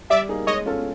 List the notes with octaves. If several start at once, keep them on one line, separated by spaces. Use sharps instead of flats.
G3 D5 E5
A#3 D#4 G#4
G#3 C#5 D#5
C#4 F4 A4